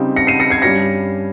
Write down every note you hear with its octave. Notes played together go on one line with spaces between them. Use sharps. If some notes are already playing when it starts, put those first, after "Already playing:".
Already playing: C#3 G3 C4 D#4
A#6 C#7
C7 D#7
A#6 C#7
G#6 C7
G2 G3 C#4 A#6 C#7